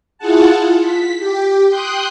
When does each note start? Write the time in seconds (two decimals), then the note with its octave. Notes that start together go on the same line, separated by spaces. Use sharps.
0.18 E4 F4 G#4 F#5 A5
0.51 F4
0.82 B6
1.19 G4
1.69 G5 C6 D#6 F#6 G6